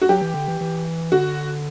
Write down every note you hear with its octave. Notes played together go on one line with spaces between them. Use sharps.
F#4
F#3 G4
E3
D3
E3
E3
D3 F#4